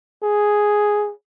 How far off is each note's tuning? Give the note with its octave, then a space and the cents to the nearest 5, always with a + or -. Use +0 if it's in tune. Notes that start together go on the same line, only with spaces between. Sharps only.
G#4 +0